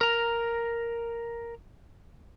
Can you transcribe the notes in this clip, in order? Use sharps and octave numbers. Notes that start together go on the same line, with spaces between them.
A#4 A#5